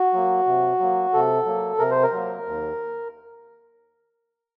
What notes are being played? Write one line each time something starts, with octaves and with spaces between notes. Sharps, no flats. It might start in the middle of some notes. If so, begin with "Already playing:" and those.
Already playing: F#4
F#3 A#3
C3
F#3 A#3
C3 A4
F#3 A#3
C3 A#4
C5
A#4
F#3
A#3
D#2